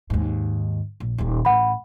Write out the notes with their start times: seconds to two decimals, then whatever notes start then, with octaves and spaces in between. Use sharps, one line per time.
0.10 D#2 G#2
1.00 A#1
1.18 D#1 D#2
1.45 A1 F#5 B5